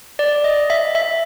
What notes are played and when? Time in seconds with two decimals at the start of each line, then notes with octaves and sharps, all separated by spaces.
0.19 D5
0.44 D#5
0.70 E5
0.95 E5